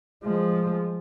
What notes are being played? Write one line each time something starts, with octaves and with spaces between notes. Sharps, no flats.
F3 G#3